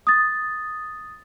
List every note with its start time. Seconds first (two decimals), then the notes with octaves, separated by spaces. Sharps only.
0.07 D#6 A6